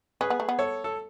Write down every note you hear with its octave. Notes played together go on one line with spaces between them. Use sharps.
C#4 G#4 B4
B3
A3
B3
A4 C#5
A4